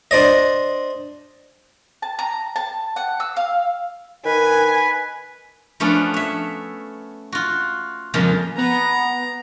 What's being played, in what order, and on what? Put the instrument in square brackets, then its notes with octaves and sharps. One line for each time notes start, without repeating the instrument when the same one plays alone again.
[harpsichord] D4 C5 D5 D#5
[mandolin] A5
A#5
A5
F#5
E6
F5
[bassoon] D#3 [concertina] B4 [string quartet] G#5
[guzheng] F3 A3 B3 C#4 D4
C#5 E5
F4 F#4
F2 C#3 F3 G#3 A#3
[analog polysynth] B3 [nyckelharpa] A#5